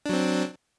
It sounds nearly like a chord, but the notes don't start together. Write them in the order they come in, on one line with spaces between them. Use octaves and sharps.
D4 F#3 C4